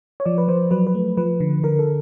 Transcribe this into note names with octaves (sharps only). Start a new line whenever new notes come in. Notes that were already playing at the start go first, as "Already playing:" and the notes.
C#5
F3 D5
B4
F3 C5
F#3 B4
B4
A3
F3 B4
D3
D3 A#4
A4